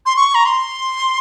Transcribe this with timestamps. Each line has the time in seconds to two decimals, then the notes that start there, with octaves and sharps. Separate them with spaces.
0.06 C6
0.17 C#6
0.35 A#5
0.46 C6